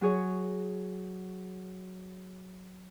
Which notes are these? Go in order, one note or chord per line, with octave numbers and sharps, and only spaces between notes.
F#3 F#4 G#4 C#5